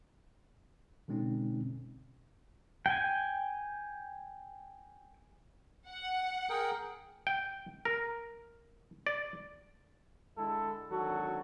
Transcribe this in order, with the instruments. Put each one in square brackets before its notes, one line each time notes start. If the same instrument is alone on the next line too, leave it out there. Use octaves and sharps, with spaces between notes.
[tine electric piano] B2 D3 G#3 C4 C#4 D#4
[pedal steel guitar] G5 G#5
[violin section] F#5
[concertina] G#4 A#4 G5
[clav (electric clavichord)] G5
A#4
D5
[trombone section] D3 G#3 E4 A4
G#1 D3 F#3 F#4 A4